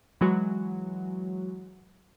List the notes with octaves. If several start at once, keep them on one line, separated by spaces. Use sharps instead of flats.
E3 F#3 G#3 F#4